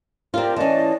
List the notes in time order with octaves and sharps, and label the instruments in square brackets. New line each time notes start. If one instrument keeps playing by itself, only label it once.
[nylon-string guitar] C4 F4 [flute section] G4 A#4 D5
[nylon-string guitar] E3 C#4 [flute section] D5 D#5 A5